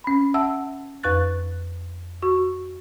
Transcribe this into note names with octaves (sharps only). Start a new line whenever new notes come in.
C#4 B5
E5 F#5 A5 E6
F2 B4 C#6 F#6 A6
F#4 C#6